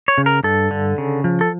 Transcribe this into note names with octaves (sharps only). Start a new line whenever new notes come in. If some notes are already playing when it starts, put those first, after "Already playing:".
C#5
C#3
A#4
G2 A4
D3
C#3
F3
A4